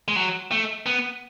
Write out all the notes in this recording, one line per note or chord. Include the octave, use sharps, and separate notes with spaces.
G#3
F#3
A3
B3